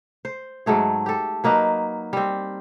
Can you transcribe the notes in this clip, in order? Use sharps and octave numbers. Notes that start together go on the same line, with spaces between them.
C5
G#2 F#3 A3 G#4
G4 A4
F#3 A#3 D#4 B4
G3 C4